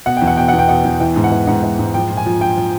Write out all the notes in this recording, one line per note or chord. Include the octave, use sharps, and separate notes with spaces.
B2 F#5
G5
E2
F#5
B2 G5
E2 F#5
G5
B2 F#5
E2
E3 G5
G#2
F#5
E3
G#2 F#5
E3
G#2
F3 G5
A#2
G#5
F3
A#2 G5
F3